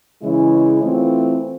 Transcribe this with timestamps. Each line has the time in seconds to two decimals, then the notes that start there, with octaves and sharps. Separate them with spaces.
0.21 C#3 E3 G#3 C#4 E4
0.80 E3 A3 C4 F4